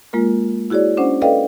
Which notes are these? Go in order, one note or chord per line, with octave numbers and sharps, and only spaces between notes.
G#3 A#3 F4 A#4
E4 F#4 G#4 C#5 D5
C#4 D4 C5 F#5
A4 B4 D5 D#5 F5 G5